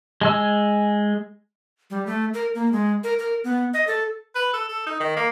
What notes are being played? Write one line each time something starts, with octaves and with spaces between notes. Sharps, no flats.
G#3 G#5 E6
G3
A3
A#4
A#3
G#3
A#4
A#4
B3
D#5
A4
B4
A4
A4
D#4
D#3
A#3